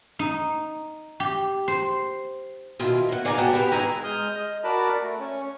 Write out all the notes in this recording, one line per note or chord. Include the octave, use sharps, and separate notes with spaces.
D#4
G4
C5
B2 D#3 E4 F4
A#3 F#5
G#4 D5 F5 G#5 A#5
B3 F#4 F#5 G5 A5
B3 G4 A#4 B4
G#2 E4 G#4 G#5 A#5
G#3 D#6 F6 G6
D#5
F#4 A#4 D5 A5 B5 F#6
A3
C#4